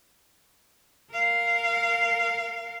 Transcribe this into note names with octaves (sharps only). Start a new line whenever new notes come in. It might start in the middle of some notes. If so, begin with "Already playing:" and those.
A#4 F5